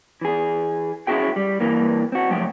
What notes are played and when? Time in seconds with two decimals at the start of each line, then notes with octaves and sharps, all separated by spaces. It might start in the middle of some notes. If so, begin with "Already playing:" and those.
0.21 E3 G#4
1.07 C#4 E4 F#4 G#4 G5
1.36 G3
1.60 G2 E3 A#3
2.12 C4 F#4
2.30 F#2 F3 A3 G5